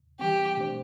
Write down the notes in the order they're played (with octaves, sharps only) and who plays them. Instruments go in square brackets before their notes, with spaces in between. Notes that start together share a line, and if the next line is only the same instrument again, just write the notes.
[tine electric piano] E3 G3 C4 [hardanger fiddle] G4
[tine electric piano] B2 A3 D4 G4 C5